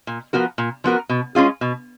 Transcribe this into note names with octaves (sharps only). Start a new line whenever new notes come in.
A#2
F3 B3 F#4 A#4
A#2
F3 B3 F#4 A#4
B2
G#3 C#4 F4 G#4
B2